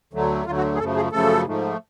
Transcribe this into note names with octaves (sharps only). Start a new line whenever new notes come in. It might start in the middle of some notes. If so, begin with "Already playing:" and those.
D2 D3 F#3 A3
D2 D3 F#3 A3 F4
F#4
G#4
F#2 C#3 F3 A3 A4
G#4
F#2 C#3 F3 A3 A4
G#2 F3 A3